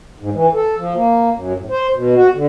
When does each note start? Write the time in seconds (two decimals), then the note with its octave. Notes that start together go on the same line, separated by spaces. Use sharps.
0.20 G#2
0.33 E3
0.54 A4
0.78 F3
0.94 A#3
1.34 F#2
1.57 A2
1.70 C5
1.93 B2
2.15 F#4
2.34 D3